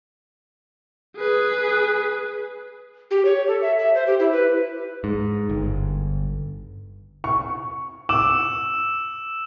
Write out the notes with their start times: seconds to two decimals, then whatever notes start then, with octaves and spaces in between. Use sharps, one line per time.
1.16 G#4 B4
3.11 G4
3.25 C#5
3.48 A4
3.62 E5
3.78 E5
3.95 C5
4.07 G4
4.20 E4
4.32 B4
5.04 G#2
5.50 G1
7.24 C#6
8.09 D6 E6 E7